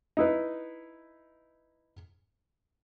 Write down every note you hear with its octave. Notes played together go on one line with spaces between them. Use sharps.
D#4 E4 B4